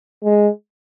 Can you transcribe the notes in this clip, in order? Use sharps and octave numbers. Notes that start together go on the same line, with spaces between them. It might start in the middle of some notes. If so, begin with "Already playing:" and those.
G#3